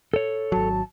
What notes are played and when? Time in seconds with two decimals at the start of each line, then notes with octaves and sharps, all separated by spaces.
0.14 A4 C#5
0.52 G#1 F#3 A5